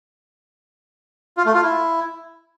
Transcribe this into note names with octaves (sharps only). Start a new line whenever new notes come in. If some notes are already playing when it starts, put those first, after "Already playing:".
F4
A3
F4
E4